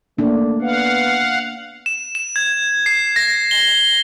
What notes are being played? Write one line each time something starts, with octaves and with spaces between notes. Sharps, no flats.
A3 A#3 D4
B3 F5 F#5
E7
E7
G#6
C7
A#6
G7